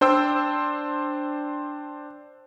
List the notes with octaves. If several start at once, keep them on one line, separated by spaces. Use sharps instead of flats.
D4 C5 G5 E6